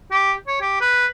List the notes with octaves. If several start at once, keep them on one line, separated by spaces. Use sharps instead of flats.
G4
C#5
G4
B4